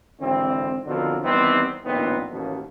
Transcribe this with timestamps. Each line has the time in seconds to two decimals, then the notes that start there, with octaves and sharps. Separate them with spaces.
0.20 G#1 D3 E3 C4
0.86 B2 D3 D#3 F3 F#3 C4
1.24 D#3 E3 G3 B3 C4
1.84 A#1 D#2 A2 B3 C4 D#4
2.31 A1 D#2 B2